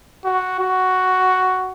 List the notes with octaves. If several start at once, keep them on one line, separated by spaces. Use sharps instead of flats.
F#4
F#4